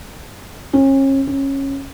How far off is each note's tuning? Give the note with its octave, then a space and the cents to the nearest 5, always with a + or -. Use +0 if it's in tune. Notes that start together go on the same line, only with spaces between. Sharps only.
C#4 -35
C#4 -15